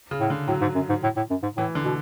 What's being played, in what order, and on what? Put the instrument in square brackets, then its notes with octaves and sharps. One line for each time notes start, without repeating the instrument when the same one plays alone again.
[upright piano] C#3
[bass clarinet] A2
[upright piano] D3
[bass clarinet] A2 [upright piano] F#3
[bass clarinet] G#2
F#2
G#2
A2
A2
F#2
G#2
[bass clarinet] A2 [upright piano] E3
[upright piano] D3
[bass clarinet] B2